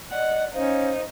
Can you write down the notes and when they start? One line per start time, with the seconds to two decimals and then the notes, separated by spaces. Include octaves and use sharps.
0.11 D5 D#5 F#5
0.54 C#4 D#4 C5 F5